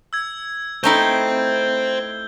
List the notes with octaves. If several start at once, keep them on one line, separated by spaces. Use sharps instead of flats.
E6 G#6
A3 D#4 E4 C5 G5 G6 G7